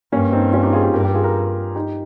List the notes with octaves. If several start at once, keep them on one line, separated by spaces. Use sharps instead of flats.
G2 A#3 C#4
C4 D#4
C#4 F4
D#4 G4
F4 G#4
D#4 G4
G2 G4 A#4
G4 A#4
F4 G#4
G4 A#4
D#4 G4